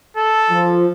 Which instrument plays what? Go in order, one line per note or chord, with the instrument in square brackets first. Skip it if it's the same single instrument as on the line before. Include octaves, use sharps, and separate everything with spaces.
[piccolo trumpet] A4
[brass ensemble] F3